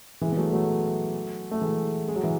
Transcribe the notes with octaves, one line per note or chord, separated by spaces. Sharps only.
E3 G#3
B3
F#3 A3
F#3 A3
A3
E3 G#3
G#3
F#3
E3